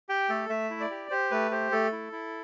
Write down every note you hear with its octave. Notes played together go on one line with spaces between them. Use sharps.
G4 G5
A3 A4
A3 E5
E4
D5
G4
G4 C5
A3 B4
G4 C5
A3 A4
E4
E4